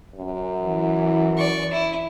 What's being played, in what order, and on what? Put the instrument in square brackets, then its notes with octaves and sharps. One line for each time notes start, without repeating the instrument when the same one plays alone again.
[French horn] F#2
[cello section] E3
[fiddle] D5 C#6
E4